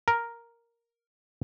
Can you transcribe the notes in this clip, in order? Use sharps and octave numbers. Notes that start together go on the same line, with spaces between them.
A#4